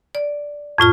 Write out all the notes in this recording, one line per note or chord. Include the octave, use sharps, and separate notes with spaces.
D5
F2 A2 F4 F6